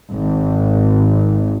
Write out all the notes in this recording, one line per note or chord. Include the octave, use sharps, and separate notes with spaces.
G#1